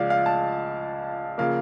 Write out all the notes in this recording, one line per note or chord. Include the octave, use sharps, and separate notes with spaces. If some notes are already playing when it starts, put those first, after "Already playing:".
Already playing: C#2 C#3 F3 D5 F5
F5
A5
C#3 F3 A#3 F5